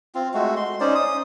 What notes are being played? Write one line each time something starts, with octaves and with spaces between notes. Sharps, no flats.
C4 F4
G#3 A3 F#4
C6
C#4 D#4 C5 D5
D#6